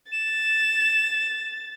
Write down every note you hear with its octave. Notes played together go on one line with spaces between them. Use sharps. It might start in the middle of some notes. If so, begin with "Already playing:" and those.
A6 E7